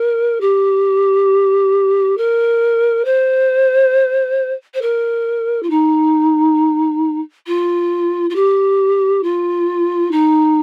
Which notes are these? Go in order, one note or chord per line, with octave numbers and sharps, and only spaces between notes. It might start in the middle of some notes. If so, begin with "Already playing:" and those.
Already playing: A#4
G4
A#4
C5
C5
A#4
F4
D#4
F4
F4
G4
F4
D#4